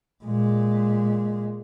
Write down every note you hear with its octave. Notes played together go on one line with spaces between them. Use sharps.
A#2 G#3